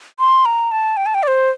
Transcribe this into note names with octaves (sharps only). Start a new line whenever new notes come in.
C6
A#5
A5
G5
A5
G5
D5
C5